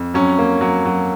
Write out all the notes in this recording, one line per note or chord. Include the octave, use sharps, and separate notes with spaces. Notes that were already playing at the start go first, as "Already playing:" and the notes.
Already playing: F2
F#3 C#4
A#3
F#3
F#3